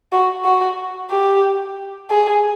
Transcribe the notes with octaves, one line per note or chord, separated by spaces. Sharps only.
F#4
F#4
G4
G#4